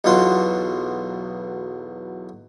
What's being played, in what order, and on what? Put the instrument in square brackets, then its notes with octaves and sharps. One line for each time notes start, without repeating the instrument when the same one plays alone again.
[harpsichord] B1 E2 B2 F#3 F4 C6